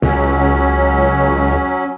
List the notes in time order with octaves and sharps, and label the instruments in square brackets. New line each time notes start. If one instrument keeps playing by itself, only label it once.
[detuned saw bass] C#2 [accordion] F#3 C#4